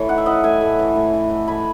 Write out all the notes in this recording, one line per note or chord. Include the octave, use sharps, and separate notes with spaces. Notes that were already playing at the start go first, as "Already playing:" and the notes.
Already playing: E3 A3 C#5
D#4 F#5
E5
E3 D#5 F#5
A3 E5 G#5
A2
E3
A2
E3
E3
A3 G#5 B5